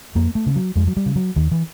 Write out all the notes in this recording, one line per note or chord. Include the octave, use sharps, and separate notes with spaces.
F2 A#3
A3
C#3
F#3
F2 G#3
F#3
G3
C#3
F#3
D#2 D#3
E3